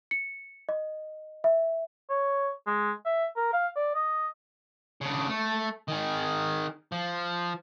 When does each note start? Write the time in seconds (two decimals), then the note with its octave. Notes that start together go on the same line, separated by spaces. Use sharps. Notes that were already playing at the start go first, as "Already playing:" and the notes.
0.11 C#7
0.69 D#5
1.44 E5
2.10 C#5
2.67 G#3
3.05 E5
3.37 A#4
3.53 F5
3.76 D5
3.95 D#5
5.01 C#3 D4
5.28 A3
5.88 D#3 G#4
6.92 F3